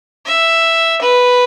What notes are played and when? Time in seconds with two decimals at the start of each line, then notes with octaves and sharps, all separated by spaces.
0.26 E5
1.02 B4